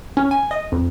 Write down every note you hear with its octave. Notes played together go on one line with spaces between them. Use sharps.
C#4
G#5
D#5
F2